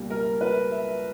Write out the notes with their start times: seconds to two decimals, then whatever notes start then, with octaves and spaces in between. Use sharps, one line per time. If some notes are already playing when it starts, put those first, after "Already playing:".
Already playing: C#2 B2 G3 A#3
0.10 A#4
0.41 B4
0.71 E5